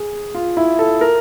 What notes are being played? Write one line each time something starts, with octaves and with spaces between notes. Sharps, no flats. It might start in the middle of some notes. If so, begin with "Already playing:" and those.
Already playing: G#4
F4
E4
A4
A#4